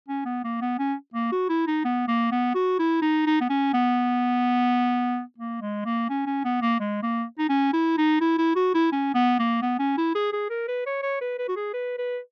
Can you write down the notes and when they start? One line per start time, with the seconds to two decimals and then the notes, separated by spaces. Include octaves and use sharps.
0.08 C#4
0.26 B3
0.44 A#3
0.62 B3
0.79 C#4
1.14 A#3
1.32 F#4
1.49 E4
1.67 D#4
1.85 B3
2.08 A#3
2.32 B3
2.55 F#4
2.79 E4
3.02 D#4
3.26 D#4
3.41 B3
3.50 C#4
3.74 B3
5.38 A#3
5.62 G#3
5.85 A#3
6.09 C#4
6.26 C#4
6.44 B3
6.62 A#3
6.80 G#3
7.03 A#3
7.39 D#4
7.50 C#4
7.73 E4
7.98 D#4
8.21 E4
8.38 E4
8.56 F#4
8.74 E4
8.92 C#4
9.15 B3
9.39 A#3
9.62 B3
9.79 C#4
9.98 E4
10.15 G#4
10.33 G#4
10.50 A#4
10.68 B4
10.86 C#5
11.03 C#5
11.21 B4
11.39 B4
11.48 F#4
11.57 G#4
11.74 B4
11.98 B4